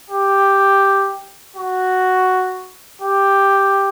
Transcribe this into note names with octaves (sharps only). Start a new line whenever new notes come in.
G4
F#4
G4